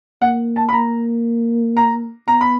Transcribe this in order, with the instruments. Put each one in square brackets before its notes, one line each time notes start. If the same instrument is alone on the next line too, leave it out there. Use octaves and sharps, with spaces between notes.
[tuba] A#3 [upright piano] F#5
[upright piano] A5
B5
[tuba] A#3 [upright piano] A#5
[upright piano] A#5
[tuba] B3 [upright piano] A#5
[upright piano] B5